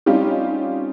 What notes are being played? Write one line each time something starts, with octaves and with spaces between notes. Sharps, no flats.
G3 C4 C#4 D#4 F4 G4